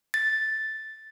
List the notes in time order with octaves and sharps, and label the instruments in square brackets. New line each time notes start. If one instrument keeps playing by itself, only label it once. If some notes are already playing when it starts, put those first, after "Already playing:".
[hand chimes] A6